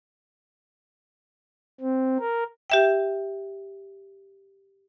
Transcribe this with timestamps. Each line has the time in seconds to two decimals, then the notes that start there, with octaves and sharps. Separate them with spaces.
1.81 C4
2.20 A#4
2.70 G4 E5 G5